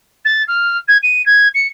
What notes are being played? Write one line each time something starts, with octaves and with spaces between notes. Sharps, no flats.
A6
F6
G#6
D#7
G#6
C#7